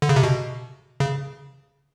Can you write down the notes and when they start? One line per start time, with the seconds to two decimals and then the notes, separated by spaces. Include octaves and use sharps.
0.02 D3
0.09 C#3
0.16 C3
0.23 B2
1.00 C#3